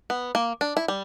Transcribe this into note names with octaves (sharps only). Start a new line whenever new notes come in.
B3
A#3
D4
E4
G3